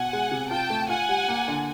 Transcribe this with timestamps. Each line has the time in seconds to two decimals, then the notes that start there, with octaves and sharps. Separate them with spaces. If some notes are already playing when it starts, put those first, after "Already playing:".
Already playing: B2 F#5 G#5
0.13 G#3
0.31 C3
0.51 F4 G5 A5
0.70 A3
0.89 F4 F#5 G#5
1.09 G3
1.28 A#3
1.48 D3